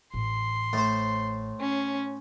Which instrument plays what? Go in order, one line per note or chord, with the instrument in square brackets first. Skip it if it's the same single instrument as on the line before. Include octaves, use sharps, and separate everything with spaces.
[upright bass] A1 [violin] C6
[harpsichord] A2 C5
[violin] C#4